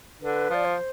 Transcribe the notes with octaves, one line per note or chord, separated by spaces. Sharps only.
D3 B4
F3 D5
C5